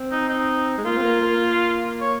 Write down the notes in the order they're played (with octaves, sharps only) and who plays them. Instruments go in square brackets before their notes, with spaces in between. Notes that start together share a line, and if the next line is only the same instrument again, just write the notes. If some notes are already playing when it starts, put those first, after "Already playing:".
Already playing: [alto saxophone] C4
[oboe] D#4
D#4
[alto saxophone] G#3
[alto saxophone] A#3 [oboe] F4
[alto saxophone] C4
A#3
A#3
[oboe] C#5